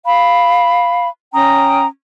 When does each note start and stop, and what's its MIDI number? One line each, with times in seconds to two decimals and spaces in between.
0.05 1.09 77
0.05 1.09 83
1.33 1.84 61
1.33 1.84 79
1.33 1.84 82
1.33 1.84 87